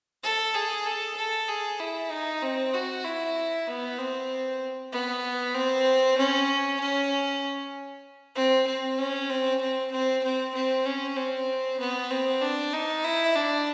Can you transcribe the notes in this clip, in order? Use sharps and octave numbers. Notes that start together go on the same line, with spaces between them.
A4
G#4
A4
A4
G#4
E4
D#4
C4
F#4
E4
B3
C4
B3
C4
C#4
C#4
C4
C4
C#4
C4
C4
C4
C4
C4
C#4
C4
B3
C4
D4
D#4
E4
D4